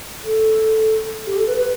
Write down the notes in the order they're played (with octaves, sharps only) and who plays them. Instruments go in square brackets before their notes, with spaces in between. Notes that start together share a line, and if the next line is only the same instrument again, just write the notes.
[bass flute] A4
G4
A4
B4
B4